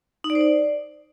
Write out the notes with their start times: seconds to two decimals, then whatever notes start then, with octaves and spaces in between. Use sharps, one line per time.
0.24 D#4
0.30 D5
0.35 C5
0.41 D5